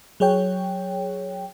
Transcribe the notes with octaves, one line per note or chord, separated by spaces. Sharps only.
F#3 G#4 C#5 G5